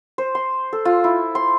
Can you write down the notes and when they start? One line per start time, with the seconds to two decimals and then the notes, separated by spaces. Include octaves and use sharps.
0.18 C5
0.35 C6
0.73 A4
0.85 F4
1.04 E4
1.35 C6